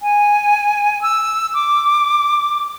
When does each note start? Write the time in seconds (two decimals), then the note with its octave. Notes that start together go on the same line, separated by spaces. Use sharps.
0.01 G#5
1.02 E6
1.54 D6